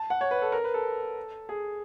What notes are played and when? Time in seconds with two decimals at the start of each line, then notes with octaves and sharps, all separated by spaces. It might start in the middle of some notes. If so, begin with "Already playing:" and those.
Already playing: A5
0.10 F#5
0.21 C#5
0.31 B4
0.42 A4
0.52 A#4
0.64 B4
0.74 A4
1.49 G#4